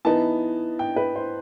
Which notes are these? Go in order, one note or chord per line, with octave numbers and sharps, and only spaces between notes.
E3 B3 D#4 A5
G5
B4
C5